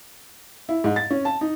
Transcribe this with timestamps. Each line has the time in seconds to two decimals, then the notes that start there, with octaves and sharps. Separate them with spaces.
0.69 E4
0.84 G#2
0.96 A6
1.11 C#4
1.25 A5
1.41 D#4